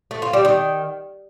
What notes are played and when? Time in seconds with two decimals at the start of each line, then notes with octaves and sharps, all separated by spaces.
0.11 A3
0.22 F4
0.33 G3
0.45 D#3